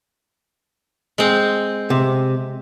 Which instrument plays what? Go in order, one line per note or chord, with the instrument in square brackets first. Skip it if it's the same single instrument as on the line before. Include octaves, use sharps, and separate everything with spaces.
[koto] G#3 C4
[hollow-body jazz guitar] C3